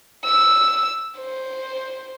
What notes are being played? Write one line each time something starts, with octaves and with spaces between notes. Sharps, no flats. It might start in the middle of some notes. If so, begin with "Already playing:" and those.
E6
C5